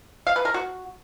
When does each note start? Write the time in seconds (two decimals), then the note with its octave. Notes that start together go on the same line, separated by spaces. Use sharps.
0.27 F5
0.36 B4
0.45 A#4
0.54 F#4